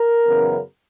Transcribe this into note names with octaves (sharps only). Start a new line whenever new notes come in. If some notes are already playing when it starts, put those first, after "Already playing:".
Already playing: A#4
F#2 C#3 E3 B3